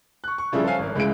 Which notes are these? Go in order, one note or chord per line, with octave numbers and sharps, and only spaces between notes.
C#6 F#6
C#6
C#3 F3 G3 E4 G#4 A4
A4 C5 C#5 E5 F5 G#5
G#1 A#4
C#2 G#3 E4 G#4 D7